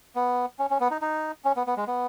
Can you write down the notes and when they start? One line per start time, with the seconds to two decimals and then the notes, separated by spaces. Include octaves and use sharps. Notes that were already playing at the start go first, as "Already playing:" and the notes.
0.15 B3
0.59 C#4
0.70 C#4
0.80 B3
0.91 D#4
1.02 D#4
1.45 C#4
1.56 B3
1.67 B3
1.77 G#3
1.87 B3